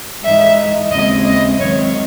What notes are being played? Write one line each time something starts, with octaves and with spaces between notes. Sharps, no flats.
G#2 E3 G#3 D#4 E5
D#2 C#3 G#3 C4 E4 D#5
D#5
G#2 D#3 F#3 C4 C#5